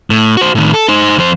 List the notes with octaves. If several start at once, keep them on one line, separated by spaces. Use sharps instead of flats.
A2
F#4 C5
A2 D#3
A4
D#4 C5
F2 C5